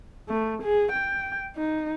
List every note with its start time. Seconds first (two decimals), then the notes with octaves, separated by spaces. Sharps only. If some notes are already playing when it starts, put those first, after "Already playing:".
0.29 A3
0.62 G#4
0.92 G5
1.56 D#4